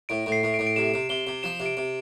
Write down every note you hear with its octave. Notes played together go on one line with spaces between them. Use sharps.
A2 D7
A2
C7
A2
D7
A2
D7
C3 E7
C3
C3 G7
C3
F3 E7
C3
D7
C3